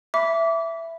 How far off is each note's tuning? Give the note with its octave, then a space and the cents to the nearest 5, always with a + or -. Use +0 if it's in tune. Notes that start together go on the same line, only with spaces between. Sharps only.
E5 +10 B5 +0 D6 -25